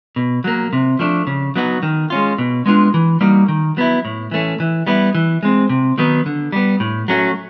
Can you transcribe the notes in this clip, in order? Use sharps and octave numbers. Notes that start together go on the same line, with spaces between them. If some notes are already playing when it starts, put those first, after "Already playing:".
B2
F#3 A#3
C3
F3 A3 D4
C#3
F#3 B3 D#4 F#4
D#3
G#3 C#4 F4
B2
G#3 B3 D4 F4
E3
G3 A#3 D#4 F#4
D#3
F#3 B3 E4
A2
E3 A3 C#4
E3
G3 B3 E4
E3
G#3 C4
C3
D#3 F#3 B3 D#4
D3
G3 B3
A2
F#3 A3 C#4 F#4